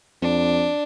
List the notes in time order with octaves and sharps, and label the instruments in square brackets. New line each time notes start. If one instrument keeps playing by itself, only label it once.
[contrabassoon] F2 [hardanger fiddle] D4